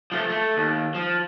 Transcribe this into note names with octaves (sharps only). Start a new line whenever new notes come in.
F3 A3
A3
D#2
F3